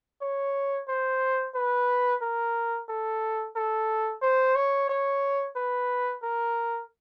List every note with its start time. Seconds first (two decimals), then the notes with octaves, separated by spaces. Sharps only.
0.21 C#5
0.88 C5
1.55 B4
2.22 A#4
2.89 A4
3.56 A4
4.22 C5
4.55 C#5
4.89 C#5
5.56 B4
6.23 A#4